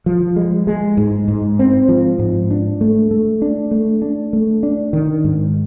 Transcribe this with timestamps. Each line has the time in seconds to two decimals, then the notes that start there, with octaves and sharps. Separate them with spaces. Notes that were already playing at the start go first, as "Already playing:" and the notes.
0.06 F3
0.36 G#3
0.67 G#3
0.97 G#2
1.28 G#2
1.59 C4
1.89 F3
2.19 G#2
2.51 D4
2.81 A3
3.11 A3
3.42 D4
3.71 A3
4.02 D4
4.33 A3
4.63 D4
4.93 D#3
5.24 G#2